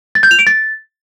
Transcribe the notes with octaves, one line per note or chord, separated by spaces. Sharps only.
A6
G6
F7
D7
A6